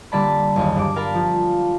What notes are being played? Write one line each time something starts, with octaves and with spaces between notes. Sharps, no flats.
D3 G3 A#3 D5 A5 B5
F#1 D#2
G2 D4 D6
A#4 F5 A5 B5
F3